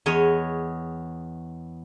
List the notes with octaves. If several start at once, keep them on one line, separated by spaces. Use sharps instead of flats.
E2 C#5 D#5